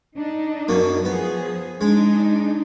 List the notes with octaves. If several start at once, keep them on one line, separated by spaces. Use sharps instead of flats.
D4 D#4
F#2 B2 A#3
F3 B3 G#4
G#3 D4 D#4